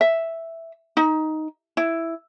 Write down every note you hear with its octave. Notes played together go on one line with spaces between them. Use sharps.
E5
D#4
E4